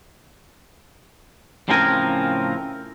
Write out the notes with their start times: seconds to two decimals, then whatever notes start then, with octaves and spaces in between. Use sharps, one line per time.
1.69 A2 C#3 F3 C4 A#4 G#5